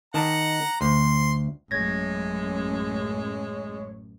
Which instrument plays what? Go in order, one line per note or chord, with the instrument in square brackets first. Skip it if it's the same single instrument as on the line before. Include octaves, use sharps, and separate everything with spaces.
[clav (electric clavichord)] D#3 A5 [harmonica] F#5 A#5
[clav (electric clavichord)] D2 [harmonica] C6
[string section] A1 F#2 [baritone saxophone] G#3 [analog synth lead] C#5 [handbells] G#6 A#6